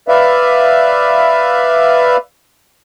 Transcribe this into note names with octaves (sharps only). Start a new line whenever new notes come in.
B4 D5 E5 F5